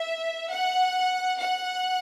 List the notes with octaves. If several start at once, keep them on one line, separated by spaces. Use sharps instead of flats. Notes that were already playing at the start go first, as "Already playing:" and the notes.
Already playing: E5
F#5
F#5